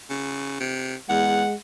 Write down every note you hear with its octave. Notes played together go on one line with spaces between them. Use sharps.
C#3
C3
E2 G#3 F#5